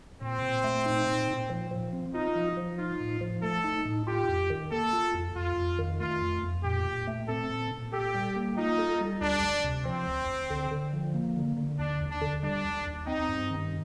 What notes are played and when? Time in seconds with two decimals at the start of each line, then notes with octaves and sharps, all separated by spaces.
0.21 A#2 C4
0.42 A#2
0.64 A3
0.86 D#4
1.07 A#2
1.28 A#2
1.50 F3
1.71 F3
1.93 C4
2.14 D#4 F4
2.35 F3
2.57 F3
2.78 D#4 F4
3.00 A2
3.21 F3
3.43 A3 A4
3.64 D#4
3.85 A2
4.07 F4 G4
4.29 F2
4.50 D#3
4.71 A#3 A4
4.93 F4
5.14 F2
5.36 F2 F4
5.57 F2
5.79 D#3
6.00 A3 F4
6.21 F2
6.43 F2
6.64 A#2 G4
6.86 A#2
7.07 A3
7.28 C4 A4
7.50 A#2
7.71 A#2
7.93 G4 A4
8.14 G3
8.36 A#3
8.57 D#4 F4
8.78 A4
9.00 G3
9.21 D2 D4
9.43 D2
9.65 C3
9.85 F3 C4
10.07 D2
10.29 D2
10.50 D3
10.71 D3
10.93 F3
11.14 A#3
11.36 D3
11.57 D3
11.79 D#2 D4
12.00 D#2
12.11 D4
12.22 D3
12.43 G3 D4
12.65 D#2
12.86 D#2
13.07 C4 D#4
13.29 G2
13.50 D#3